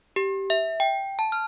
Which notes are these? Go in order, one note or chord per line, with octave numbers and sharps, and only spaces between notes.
G4
E5
G5
A5
F6